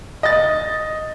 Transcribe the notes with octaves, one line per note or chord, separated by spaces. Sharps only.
D#5 A6